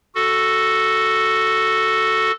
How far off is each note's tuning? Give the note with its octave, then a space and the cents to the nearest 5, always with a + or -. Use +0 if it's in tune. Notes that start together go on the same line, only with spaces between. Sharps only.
F#4 +0 A4 +0